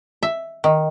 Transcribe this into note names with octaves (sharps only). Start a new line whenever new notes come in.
E5
D#3